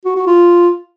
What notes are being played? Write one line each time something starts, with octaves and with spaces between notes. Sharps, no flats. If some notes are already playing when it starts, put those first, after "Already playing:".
F#4
F#4
F4